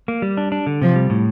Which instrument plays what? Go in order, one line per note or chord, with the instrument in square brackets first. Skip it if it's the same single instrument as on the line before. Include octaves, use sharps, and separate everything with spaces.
[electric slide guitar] A#3
G3
D4
D4
D3
[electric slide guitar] C3 [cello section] F3
[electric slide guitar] G3
A2